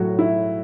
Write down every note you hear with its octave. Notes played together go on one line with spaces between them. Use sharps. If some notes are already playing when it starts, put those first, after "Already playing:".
Already playing: A2 F#3 A3 F#4
E4